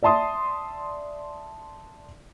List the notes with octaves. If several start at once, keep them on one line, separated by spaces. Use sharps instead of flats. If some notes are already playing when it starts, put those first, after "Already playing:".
D5 E5 A5 C6 D#6